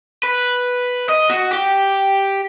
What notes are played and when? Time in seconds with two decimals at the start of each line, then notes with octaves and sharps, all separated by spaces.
0.23 B4
1.09 D#5
1.30 F#4
1.51 G4